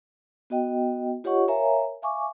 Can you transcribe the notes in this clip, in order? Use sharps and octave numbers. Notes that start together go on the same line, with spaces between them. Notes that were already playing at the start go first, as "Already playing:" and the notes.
B3 F#4 D#5 G5
F4 G4 C#5 D#5 F#5 C#6
A#4 C#5 E5 F5 G#5 A#5
E5 F5 G#5 C#6 D6